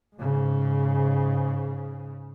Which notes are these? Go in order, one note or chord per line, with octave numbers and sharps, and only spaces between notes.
G#2 C#3